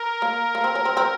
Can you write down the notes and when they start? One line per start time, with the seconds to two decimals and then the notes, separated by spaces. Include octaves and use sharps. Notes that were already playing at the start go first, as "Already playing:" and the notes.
Already playing: A#4
0.22 A#3
0.55 A#3
0.64 C4
0.75 C#4
0.85 C4
0.97 C4